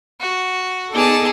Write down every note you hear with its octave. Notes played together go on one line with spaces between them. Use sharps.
F#4
B3 D#4 G#4 A4 D5 A5